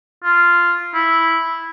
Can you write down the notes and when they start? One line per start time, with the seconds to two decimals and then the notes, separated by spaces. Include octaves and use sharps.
0.24 F4
0.94 E4